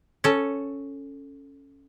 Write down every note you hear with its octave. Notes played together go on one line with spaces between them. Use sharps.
C#4 A4